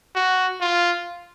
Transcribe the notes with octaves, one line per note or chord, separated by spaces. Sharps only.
F#4
F4